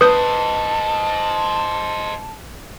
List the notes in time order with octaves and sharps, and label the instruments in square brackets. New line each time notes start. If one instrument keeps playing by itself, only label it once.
[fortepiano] B4 [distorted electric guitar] C5 D#5 [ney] A5 [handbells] D#6 G6